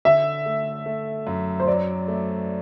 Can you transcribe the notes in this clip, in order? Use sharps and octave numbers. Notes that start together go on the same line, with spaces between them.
D3 E5
A3
A3
F#2
C5
F#3 D5
A3